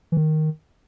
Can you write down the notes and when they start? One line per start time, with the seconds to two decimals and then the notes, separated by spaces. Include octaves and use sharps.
0.12 E3
0.17 D#3